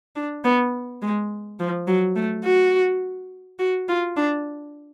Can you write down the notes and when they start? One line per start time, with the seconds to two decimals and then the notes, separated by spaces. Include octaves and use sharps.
0.16 D4
0.44 B3
1.02 G#3
1.60 F3
1.87 F#3
2.16 A3
2.45 F#4
3.59 F#4
3.88 F4
4.17 D4